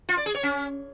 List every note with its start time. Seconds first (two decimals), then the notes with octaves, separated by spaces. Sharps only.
0.09 F4
0.17 D5
0.26 G#4
0.35 C#5
0.43 C#4